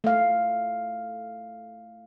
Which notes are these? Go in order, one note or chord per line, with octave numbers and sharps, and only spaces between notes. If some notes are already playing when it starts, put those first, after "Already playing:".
A3 F5